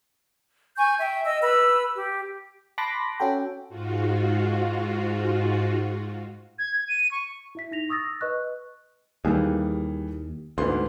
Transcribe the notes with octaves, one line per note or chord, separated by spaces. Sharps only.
G#5 C#6 G6
E5 G5
D#5 E6
B4 E6
G4
A5 B5 C6 D6 F#6 A#6
C#4 F#4 A4 G5
G#2 F4 F#4
G#6
G#6
D#7
C#6
E4 E5 B6
D#4 A#6 F7
C#6 D#6 E6 A6 A#6
B4 D#5 C#6 F#6
D#2 E3 G3 G#4
D2 G#2 B3 C6